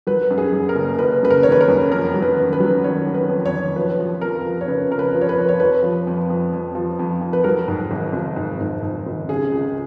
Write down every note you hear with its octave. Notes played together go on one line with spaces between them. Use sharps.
F#3 B4
F#2
G#4
F#2
A#4
F#1
F#1 B4
F#2 B4
A#4
D#3 C#5
B4
A#4
F#2
F2 A#4
F#3
B4
D#3
B4
F#3
D#3 C#5
F#3
B4
F2
C#5
D#3
F3 B4
F3
F2 A#4
F3
C#5
C#3 B4
F2 A#4
B4
F3
C#5
B4
F2
C#5
F2 B4
F3
F2
F2
F2
F3
F2
F2
B4
F#3 A#4
G#2
G#1
G#1
G#2
G#2
G#2
G#1
C#3 G#4
C#2